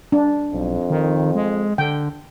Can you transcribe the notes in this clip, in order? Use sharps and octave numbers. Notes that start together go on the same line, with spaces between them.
D4
B1 F2
D#3
G#3
D3 G5